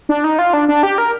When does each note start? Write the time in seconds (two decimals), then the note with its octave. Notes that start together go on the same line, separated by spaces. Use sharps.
0.09 D4
0.24 D#4
0.39 F4
0.53 D4
0.68 D4
0.83 G4
0.98 A#4